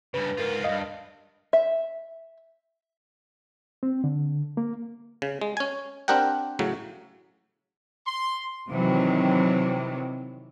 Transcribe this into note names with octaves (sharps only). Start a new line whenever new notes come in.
G2 C#3 B4
G#2 F4 A#4
C#2 G2 D#5 F5
E5
C4
D3
A#3
C#3
G#3
C#4 G#5
C4 D4 G4 A#4 F#5 G5
A2 C#3 F#3
C6
C3 D#3 E3 F#3